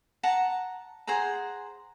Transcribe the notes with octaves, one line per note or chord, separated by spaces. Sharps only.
F#5 A5 A#5
G#4 C5 F#5 A#5